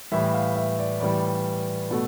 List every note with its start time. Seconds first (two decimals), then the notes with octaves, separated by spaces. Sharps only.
0.11 A2 E3 G3 E5
0.34 F5
0.56 E5
0.79 D5
1.00 A2 E3 G3 D5
1.91 B2 A3